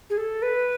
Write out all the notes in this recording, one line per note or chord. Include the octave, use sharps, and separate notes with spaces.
G#4
A4
B4